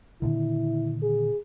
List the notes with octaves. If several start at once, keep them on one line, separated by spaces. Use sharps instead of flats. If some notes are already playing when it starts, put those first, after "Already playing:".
A#2 D3 D#3 E4
G#4